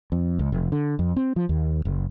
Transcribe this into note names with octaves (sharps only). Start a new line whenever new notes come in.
F2
C#2
F1
D3
F2
C4
F3
D#2
F#1